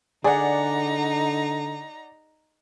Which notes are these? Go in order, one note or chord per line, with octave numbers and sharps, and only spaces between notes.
D3 D#4 G#4 D5 F#5 A#5